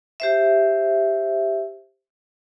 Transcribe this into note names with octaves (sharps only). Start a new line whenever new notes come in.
G4 C5 E5